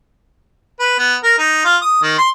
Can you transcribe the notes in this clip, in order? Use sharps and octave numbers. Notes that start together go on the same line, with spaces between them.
B4
B3
A#4
D#4
F4
D#6
D#3
C6